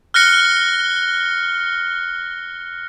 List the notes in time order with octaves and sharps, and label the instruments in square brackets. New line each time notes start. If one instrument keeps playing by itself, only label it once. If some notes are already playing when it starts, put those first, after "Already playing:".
[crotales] F6 F#6 A#6 C#7 G7